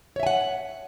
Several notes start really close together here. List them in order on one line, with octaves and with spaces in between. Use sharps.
C#5 E5 G#5 F#5